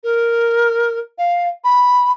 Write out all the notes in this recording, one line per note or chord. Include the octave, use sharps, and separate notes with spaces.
A#4
F5
B5